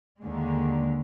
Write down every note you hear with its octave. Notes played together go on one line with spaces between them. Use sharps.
D#2 D3 G#3